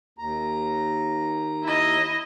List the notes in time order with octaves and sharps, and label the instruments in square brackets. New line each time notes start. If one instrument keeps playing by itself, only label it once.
[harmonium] D#2 A#5
[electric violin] E4 D#5